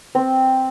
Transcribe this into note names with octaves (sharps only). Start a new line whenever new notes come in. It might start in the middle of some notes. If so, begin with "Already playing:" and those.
C4